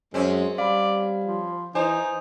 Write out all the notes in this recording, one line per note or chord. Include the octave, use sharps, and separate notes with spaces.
F#2 G#3 C4 C#4
G3 D5 F5 B5
F3
E3 D#4 C5 G#5